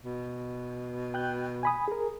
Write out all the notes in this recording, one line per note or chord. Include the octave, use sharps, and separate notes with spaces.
B2
G5 F#6 G6
G#5 B5 D#6
G#4 A#4